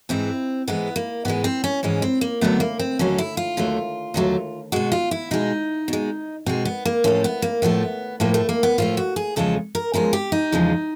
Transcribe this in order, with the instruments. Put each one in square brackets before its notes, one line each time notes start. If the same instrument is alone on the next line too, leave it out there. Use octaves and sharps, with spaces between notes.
[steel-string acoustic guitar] G#2 E3 G#3 C4
G#2 E3 G#3 B3
A#3
G#2 E3 G#3 B3
C4
C#4
G#2 E3 G#3 C#4
C4
A#3
D#2 D3 F#3 A3 B3
A#3
C4
D#2 D3 F#3 A3 C#4
E4
F4
D#2 D3 F#3 A3
D#2 D3 F#3 A3
B2 G#3 F#4
F4
E4
B2 G#3 D#4
B2 G#3
B2 G#3 C4
B3
A#3
A2 F3 A3 C#4
B3
A#3
A2 F3 A3 B3
A2 F3 A3 A#3
A3
A#3
B3
A2 F3 A3 F4
F#4
G#4
E2 C#3 F3 G#3 A4
A#4
E2 C#3 F3 G#3 A#4
G4
D#4
E2 C#3 F3 G#3